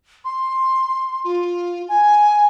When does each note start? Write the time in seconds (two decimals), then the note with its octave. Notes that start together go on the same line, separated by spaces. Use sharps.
0.25 C6
1.24 F4
1.89 G#5